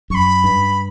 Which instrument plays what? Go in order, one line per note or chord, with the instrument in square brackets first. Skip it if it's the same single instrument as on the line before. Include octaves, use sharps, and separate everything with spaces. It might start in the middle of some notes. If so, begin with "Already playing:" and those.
[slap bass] F#2 [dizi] C#6
[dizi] B5
[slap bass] G2